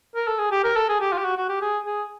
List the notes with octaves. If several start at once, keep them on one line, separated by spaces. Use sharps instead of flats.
A#4
A4
G#4
G4
A#4
A4
G#4
G4
F4
G4
F#4
F#4
G4
G#4
G#4